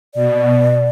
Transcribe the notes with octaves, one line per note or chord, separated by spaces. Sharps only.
B2 D5